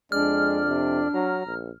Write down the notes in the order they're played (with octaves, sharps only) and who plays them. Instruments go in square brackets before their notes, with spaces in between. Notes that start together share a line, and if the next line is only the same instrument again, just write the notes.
[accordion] F2 D5 [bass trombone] G#3 [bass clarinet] D4 [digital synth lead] F6
[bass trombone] C3
[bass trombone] F#3 [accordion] A#5
[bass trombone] A#1